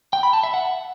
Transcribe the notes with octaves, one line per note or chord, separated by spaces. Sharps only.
G5
B5
A5
E5
F#5